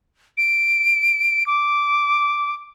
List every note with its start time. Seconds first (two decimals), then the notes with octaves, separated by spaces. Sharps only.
0.38 D7
1.46 D6